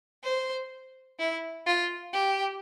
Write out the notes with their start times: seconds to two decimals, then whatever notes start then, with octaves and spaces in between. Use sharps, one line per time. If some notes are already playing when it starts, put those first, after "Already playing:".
0.24 C5
1.19 E4
1.66 F4
2.13 G4